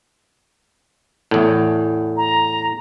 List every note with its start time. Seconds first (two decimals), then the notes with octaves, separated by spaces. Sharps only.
1.31 E2 A2
2.17 A#5